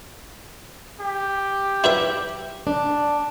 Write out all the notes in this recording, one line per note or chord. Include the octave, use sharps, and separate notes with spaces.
G4
E4 B4 E5
D4